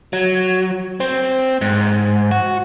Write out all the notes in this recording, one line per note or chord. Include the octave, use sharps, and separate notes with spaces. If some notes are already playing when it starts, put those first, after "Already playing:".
F#3
C4
G#2
F#4